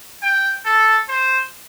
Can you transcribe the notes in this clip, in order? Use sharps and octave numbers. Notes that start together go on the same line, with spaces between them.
G5
A4
C5